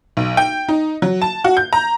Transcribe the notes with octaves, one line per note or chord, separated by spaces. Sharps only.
B1
G5
D#4
F#3
A5
F#4
G6
A#5